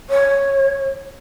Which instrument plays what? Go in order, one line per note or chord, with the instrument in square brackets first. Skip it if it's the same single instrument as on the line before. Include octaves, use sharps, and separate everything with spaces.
[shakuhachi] C#5